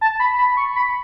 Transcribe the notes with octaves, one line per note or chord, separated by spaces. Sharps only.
A5
B5
B5
C#6
B5